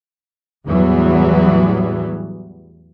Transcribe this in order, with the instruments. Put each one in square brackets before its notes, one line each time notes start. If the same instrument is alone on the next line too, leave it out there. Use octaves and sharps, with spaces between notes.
[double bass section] E2 A2 E3 F#3 G3 B3